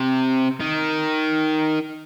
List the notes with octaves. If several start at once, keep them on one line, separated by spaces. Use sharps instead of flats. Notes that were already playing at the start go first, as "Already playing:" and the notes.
Already playing: C3
D#3